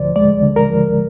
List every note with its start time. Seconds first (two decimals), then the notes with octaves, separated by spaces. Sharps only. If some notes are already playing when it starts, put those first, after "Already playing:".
Already playing: D2 D3 F3 C5 D5
0.16 G#3 D5
0.43 D3
0.56 A#4
0.70 F3